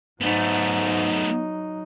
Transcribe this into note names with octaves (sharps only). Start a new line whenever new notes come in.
G#2 F#3 A3 B3 D#4